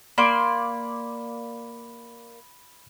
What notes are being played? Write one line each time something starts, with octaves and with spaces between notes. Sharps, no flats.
A#3 D5 B5 C6